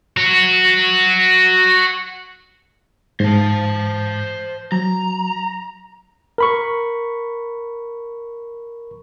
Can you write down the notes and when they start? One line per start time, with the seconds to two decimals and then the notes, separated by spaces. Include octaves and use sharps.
0.17 F#4 C#5
3.20 G#2 C5 A5
4.72 F#3 A#5
6.38 A#4 B5 C#6